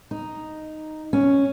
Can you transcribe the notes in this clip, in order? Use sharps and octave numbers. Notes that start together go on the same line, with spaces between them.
D#4
C#4